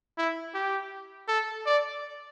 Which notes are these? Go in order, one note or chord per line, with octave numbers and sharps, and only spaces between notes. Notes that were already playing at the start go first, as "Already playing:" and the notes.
E4
G4
A4
D5